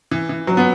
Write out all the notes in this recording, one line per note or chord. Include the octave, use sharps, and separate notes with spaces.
E3
E3
F#3
B3